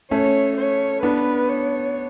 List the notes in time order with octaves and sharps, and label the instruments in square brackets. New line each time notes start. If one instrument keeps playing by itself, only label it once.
[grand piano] A3 C#4 [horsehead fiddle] C#5
[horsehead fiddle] C#5
[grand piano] B3 D4 [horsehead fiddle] B4
[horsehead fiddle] C#5